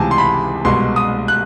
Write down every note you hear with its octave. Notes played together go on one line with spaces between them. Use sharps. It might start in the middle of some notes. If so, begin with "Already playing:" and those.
Already playing: C#2 C3 E3 G#3 G#5 A5
C6
B5
C2 B2 G#3 C6
D#6
F#6